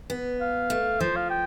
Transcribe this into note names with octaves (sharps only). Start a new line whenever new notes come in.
B3
F5
A3
F3 C5
F5
G5